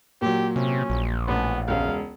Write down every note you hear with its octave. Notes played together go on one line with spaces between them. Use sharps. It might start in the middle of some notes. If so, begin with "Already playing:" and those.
A#2 F#3 G4
C3 C#4
A#1
A1 B3
E1 C#2 F5